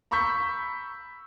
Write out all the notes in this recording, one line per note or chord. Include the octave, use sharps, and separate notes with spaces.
A#5 B5 C#6 E6 G6 B6